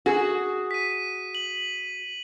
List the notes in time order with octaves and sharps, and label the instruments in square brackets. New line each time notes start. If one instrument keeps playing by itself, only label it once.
[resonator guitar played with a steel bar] F#4 G#4
[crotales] B6 D#7
F#7